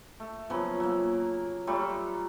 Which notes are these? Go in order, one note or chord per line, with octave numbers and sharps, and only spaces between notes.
A3
C#3 F3 F#3 B3
F#3 A#3
F#3 G3 A3 F4